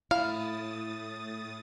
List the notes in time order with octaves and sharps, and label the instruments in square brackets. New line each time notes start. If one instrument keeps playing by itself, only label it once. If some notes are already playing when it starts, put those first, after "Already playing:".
[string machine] A2 D#6 A6 [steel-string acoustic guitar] E4 [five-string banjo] F5